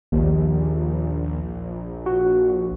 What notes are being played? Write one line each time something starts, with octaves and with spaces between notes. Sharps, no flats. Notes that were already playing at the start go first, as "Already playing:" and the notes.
A#1 D#2
F#4